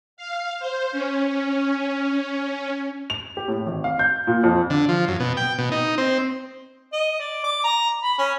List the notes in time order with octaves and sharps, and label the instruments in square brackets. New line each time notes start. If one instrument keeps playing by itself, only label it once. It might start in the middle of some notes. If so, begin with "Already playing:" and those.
[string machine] F5
C5
C#4
[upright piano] F7
G4
A2
G#1
F5
G6
A#2
F2
[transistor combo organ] D3
F3
F#2
B2
G5
B2
D#4
C4
[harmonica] D#5
D5
D6
A#5
B5
C#4